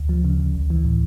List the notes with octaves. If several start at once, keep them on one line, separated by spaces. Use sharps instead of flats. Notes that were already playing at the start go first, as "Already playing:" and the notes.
Already playing: D2
F3
C#3
D2
B1
E3
A2